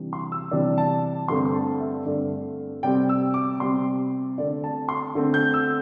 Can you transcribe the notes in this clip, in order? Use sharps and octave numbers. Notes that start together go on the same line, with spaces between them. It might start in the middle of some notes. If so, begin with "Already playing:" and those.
Already playing: C3 E3 G3 D4
C6
E6
C3 E3 G3 D4
A5
G2 D3 A3 C4 C6
C6
A5
E5
G2 D3 A3 C4 D5
C3 G3 C4 G5
E6
D6
C3 G3 C4 C6
D3 A3 C4 D5
A5
C6
D3 A3 C4
G6
E6